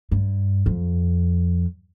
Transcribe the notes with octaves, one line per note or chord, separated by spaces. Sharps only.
G2
F2